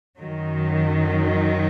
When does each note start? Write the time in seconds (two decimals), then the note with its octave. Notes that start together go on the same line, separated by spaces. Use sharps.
0.18 F#2 D#3 F#3